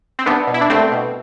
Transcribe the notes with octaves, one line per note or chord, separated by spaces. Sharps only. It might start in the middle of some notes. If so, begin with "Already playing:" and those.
C4
C2 B3 D4
B2
E4
D4
C2 A3 C4
B2